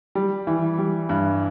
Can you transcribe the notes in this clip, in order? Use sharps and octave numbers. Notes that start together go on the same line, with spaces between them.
G3
E3
G3
G2